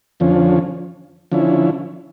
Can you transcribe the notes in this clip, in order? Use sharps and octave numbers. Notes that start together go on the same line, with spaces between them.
F2 D3 F3 C#4
D3 F3 C#4 E4